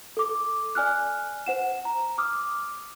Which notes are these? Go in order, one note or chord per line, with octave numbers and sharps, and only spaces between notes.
A4 D6
D5 G#5 F6 F#6
C5 F#5 E7
A#5
D6 D#6 F6